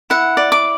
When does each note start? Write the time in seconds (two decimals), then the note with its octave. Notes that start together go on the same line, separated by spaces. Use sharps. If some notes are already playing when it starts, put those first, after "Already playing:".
0.10 E4 F#5
0.37 D5
0.52 D6